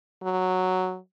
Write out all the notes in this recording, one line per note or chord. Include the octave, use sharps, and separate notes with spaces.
F#3